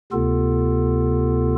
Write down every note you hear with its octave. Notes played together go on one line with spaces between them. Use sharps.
D2 C3 B3 F4 A4